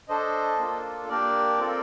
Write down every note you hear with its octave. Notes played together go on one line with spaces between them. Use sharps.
D4 A4 C5 D#5
A#3 D4 F4 A4
A#3 D4 G4 A#4 D5
C4 F4 A4